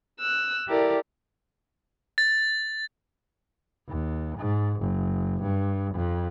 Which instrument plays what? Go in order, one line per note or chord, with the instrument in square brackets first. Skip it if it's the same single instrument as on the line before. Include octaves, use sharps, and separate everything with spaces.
[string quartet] E6 F#6
E4 G4 A4 A#4 D5
[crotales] A6
[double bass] D#2
G#2
F#1
G2
F2